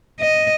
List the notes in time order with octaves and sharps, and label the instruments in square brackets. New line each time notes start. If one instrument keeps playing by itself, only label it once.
[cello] D#5